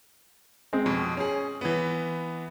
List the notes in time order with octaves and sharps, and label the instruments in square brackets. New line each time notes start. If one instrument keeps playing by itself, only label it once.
[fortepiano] G#3 C4
[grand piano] F2 B2
C#4 G#4
E3 B3